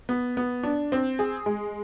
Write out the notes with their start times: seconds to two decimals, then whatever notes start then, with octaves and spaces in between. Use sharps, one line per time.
0.09 B3
0.37 B3
0.63 D4
0.92 C4
1.19 G#4
1.46 G#3